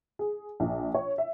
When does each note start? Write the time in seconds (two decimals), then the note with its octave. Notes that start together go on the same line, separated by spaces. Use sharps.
0.19 G#4
0.60 A#1
0.94 C#5
1.18 E5